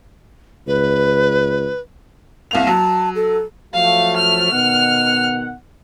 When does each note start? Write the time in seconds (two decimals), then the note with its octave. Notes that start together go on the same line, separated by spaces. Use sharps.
0.67 C#2 B4
2.51 C2 A#3 F7
2.67 F#3 A5
3.15 A4
3.74 F3 F#3 A3 F5
4.16 F6
4.52 B2 D#3 F#5